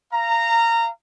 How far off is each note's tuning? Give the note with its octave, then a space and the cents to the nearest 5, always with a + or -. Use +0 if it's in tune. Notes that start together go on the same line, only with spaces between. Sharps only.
F5 -25 A#5 -15